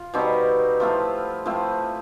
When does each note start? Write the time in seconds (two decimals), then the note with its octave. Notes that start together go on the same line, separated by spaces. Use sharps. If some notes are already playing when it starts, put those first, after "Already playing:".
Already playing: F4
0.14 B2 G3 C4 D#4
0.80 F3 A3 C4 E4 F4
1.46 F3 A3 C4 E4